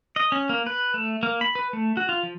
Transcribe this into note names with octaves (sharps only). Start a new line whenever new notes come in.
D#5
C#4
A#3
B4
A3
A#3
B5
B4
A3
F#4
F4
F3